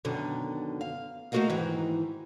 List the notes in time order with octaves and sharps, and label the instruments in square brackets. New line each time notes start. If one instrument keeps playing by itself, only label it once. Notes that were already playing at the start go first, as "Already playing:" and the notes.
[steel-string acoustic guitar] F#2 B2 D3 D#3
F5
A3 A#3 F#4 A#4 D#5 F5
G#2 D#3 E3